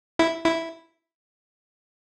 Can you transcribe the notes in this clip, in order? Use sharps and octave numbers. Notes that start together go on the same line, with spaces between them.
E4
E4